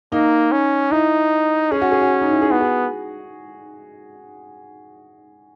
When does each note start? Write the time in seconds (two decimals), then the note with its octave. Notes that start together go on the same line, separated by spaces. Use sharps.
0.12 A#3 D#4
0.52 C#4
0.92 D#4 E4
1.71 C#4 G#4
1.82 F#4
1.92 G#4
2.01 F#4
2.22 D#4
2.31 E4
2.42 G#4
2.51 B3 F#4
2.61 G#4